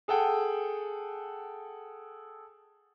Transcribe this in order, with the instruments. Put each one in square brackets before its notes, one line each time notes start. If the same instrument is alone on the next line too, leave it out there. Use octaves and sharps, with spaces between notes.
[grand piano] G#4 A4 F#5 G5